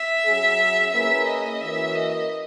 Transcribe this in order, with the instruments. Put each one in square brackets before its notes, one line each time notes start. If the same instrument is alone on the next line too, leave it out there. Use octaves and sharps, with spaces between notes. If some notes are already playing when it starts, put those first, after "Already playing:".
Already playing: [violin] E5
[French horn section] F#3 C#4 G#4
[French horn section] A#3 C#4 E4 G#4 B4 [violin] E5
[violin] D#5
[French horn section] E3 A#3 C#4 F#4 A#4 [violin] E5
[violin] D#5